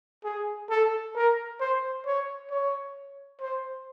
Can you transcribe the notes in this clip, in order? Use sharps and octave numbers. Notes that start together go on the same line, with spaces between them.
G#4
A4
A#4
C5
C#5
C#5
C5